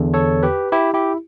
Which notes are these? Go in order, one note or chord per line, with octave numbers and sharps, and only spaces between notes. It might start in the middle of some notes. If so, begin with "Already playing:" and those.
Already playing: E2 D3
A4 C#5
G4 B4
E4 G4
E4 G4